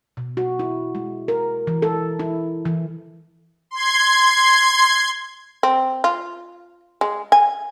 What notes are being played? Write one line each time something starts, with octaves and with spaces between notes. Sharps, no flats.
B2
F#4
E4
G#3
A#4
E3
A4
E4
E3
C6 G#6
C4
F4
G#3
G#5